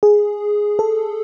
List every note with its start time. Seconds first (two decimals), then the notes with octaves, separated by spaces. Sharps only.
0.03 G#4
0.79 A4